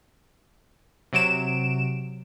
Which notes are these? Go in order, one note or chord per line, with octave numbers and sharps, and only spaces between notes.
C3 F#3 D7 E7